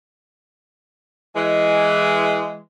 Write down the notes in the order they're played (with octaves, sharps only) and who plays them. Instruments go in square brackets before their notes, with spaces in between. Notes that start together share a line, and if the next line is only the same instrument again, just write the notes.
[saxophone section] E3 G#3